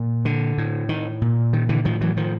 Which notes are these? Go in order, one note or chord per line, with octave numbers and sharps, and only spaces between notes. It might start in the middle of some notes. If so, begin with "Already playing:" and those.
Already playing: A#2
D3
A2
D#3
A#2
D#3
D3 E3
A2 D#3 F3
E3 F#3
D#3 F3